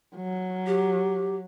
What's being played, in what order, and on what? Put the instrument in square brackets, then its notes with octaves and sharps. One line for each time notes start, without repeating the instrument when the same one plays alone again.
[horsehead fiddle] F#3
[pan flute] G4